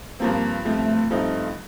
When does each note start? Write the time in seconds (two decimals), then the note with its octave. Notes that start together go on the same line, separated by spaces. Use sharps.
0.20 G2 F3 A#3 C4
0.65 G2 F3 A3 C4
1.10 G2 F3 A3 C4 D#4